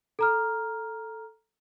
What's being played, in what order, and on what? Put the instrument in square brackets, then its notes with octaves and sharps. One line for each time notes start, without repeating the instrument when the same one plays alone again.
[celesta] A4 A#5 F6